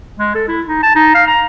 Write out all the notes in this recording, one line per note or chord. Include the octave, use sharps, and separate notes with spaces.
G#3
A4
E4
D#4
A5
D#4
F5
A#5